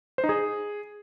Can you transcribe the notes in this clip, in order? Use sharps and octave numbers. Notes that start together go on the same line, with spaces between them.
C5
D#4
G#4